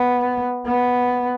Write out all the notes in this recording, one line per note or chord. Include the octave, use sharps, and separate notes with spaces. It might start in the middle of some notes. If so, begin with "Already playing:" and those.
Already playing: B3
B3